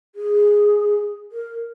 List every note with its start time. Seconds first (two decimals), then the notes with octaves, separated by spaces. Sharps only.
0.15 G#4
1.32 A#4